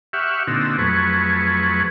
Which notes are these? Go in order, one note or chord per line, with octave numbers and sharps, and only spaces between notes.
G4 E5 F#5 C#6 F6
A#2 D3 C4 D#4 F#4 E6
F2 F#3 A3 G#4 B4 C#6